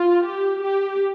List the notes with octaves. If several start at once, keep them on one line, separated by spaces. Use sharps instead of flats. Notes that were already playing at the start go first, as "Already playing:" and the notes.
Already playing: F4
G4
G4